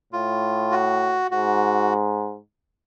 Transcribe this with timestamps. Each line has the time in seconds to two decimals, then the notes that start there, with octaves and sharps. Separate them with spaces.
0.13 A2 F4
0.72 F#4
1.31 G#2 F#4